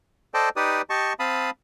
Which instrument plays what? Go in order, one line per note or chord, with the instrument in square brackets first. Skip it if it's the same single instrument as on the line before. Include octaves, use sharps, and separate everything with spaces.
[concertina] A4 C5 D5 D#5 G5 A5
D#4 G4 B4 D5 D#6
G4 D#5 A5 C#6
C4 F5 A5 B5 D#6